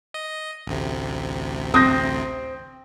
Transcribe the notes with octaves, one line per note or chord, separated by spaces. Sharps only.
D#5
A1 D2 C3
C4 D#6 G6 A#6